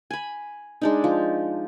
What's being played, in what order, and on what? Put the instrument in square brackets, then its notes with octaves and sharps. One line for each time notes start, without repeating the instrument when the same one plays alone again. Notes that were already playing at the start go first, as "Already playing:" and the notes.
[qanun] G#5 B5
G#3 D4 D#4
F3